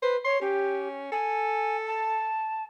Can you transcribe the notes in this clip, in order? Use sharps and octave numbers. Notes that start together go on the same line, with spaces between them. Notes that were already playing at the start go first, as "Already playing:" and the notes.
B4 C5
C#5 C6
C#4 G4
A4 G#5
A5